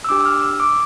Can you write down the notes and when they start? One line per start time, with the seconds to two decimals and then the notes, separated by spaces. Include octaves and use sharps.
0.04 E6
0.09 D4 G4 D6
0.21 E6
0.26 F6
0.42 E6
0.60 D6